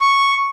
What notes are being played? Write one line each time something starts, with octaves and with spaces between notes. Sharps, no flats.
C#6